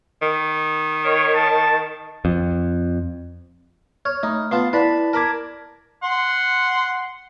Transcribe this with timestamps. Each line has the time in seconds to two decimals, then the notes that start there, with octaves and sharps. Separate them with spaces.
0.22 D#3
1.05 C#5
1.34 A5
2.25 F2
4.05 C#5 F6
4.23 A3 D#4
4.51 B3 F4 A5 C7
4.73 E4 B4 D5 A5 B5
5.13 A#4 A5 B5 D6 G#6
6.03 F#5 C6